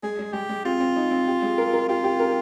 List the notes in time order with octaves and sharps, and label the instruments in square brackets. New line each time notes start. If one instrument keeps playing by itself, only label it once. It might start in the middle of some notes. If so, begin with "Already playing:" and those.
[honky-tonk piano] G#3 [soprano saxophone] G#4
[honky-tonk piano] G#3
[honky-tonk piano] G#3 [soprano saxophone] G4
[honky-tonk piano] G#3
[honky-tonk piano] C4 [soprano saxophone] F4
[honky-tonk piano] C4
D#4
C4
G4
G#3
A#4
A#4
[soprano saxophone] F4 [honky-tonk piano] G4
[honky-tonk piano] G4
A#4